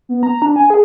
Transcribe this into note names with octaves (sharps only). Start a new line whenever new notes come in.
B3
A#5
D4
G#5
G#4